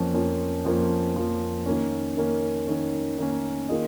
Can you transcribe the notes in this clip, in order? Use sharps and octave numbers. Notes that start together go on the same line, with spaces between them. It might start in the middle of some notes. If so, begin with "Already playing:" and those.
Already playing: F2 F3 A#3 C#4
F2 F3 A#3 C#4
F2 F3 A#3 C#4
F2 F3 A#3 C#4
D#3 A#3 C#4
D#3 A#3 C#4
D#3 A#3 C#4
D#3 A#3 C#4
D#3 A#3 F4 G#4 D#5